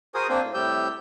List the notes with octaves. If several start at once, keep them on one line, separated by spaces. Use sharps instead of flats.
F#4 G#4 A#4 C5 G#5 D#6
A#3 C4 D4 C5
A2
A2 C3 G3 G4 E6 G6